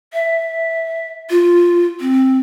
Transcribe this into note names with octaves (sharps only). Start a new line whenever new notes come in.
E5
F4
C4